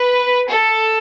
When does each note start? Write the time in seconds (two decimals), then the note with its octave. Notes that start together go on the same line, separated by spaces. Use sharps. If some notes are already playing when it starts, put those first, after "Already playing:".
Already playing: B4
0.49 A4